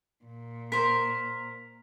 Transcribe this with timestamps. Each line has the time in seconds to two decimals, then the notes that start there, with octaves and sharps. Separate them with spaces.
0.25 A#2
0.72 A#4 C5 B6